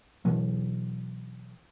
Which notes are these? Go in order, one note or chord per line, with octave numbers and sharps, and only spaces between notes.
B2 E3 F#3